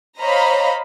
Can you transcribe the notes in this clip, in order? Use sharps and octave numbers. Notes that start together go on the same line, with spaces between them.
C5 C#5 D#5 F5 A#5 B5